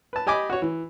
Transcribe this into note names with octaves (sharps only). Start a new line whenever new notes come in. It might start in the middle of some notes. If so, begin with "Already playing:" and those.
B4 A5
G4 D#5 G#5 B5 D6
F#4 C#5
E3